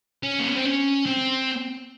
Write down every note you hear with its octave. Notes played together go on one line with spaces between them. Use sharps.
C#4
A#3
B3
C4
C#4
C4